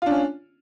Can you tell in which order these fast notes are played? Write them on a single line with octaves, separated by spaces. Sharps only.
F4 D4 C#4